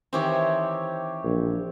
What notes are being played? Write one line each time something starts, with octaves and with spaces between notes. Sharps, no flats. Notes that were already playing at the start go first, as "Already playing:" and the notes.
D#3 E3 C4 D#4 G4 C#5
A#1